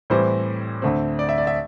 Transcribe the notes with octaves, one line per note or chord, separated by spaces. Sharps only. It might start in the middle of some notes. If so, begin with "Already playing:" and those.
A2 E3 G3 C4 C5
D2 D3 A3 C4
D5
E5
D5
E5